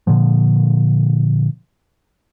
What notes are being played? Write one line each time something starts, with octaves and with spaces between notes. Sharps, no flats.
A#2 D3 F3